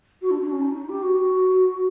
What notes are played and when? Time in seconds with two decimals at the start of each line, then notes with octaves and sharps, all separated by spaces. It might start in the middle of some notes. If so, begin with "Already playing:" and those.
0.21 F#4
0.30 D4
0.41 D4
0.51 C#4
0.61 D#4
0.74 D#4
0.89 G4
1.02 F#4